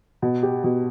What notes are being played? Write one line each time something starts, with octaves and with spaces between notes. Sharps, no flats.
B2
G4
B2